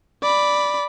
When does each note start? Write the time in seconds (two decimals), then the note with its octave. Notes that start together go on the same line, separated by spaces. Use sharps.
0.22 D5 B5